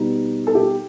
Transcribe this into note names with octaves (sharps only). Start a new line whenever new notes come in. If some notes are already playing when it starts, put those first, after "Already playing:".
Already playing: B2 G3 D#4
A4
G4